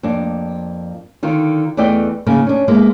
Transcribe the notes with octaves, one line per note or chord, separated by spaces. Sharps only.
F2 A#3 D4
D3 D#3 F4
E2 E3 A3 D5 D#5 G5
C#3 A#3 D#4 A#4
C#4 D4
G#3 A#3 B3 E4